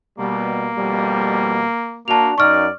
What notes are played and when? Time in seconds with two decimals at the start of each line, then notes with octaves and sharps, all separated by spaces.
0.19 B2 G3 A#3
0.77 F2 B2 G3
2.08 A#3 D4 F#4 A5 F7
2.38 F#2 D#4 D5 C#6 F6